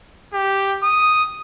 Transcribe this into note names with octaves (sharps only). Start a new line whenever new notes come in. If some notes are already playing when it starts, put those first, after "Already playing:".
G4
D#6